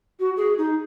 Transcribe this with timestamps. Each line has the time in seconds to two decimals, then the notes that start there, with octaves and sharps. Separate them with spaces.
0.20 F#4
0.37 G#4
0.58 D#4